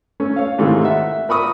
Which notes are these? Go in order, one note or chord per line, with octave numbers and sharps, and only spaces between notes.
A3 C#4
C#5 F5
G#2 C3 D#3 E3 A3
E5 F#5
A#4 B5 C#6 D#6